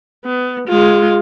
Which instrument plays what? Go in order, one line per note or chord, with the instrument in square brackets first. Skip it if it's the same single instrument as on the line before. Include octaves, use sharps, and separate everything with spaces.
[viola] B3
G#3 F4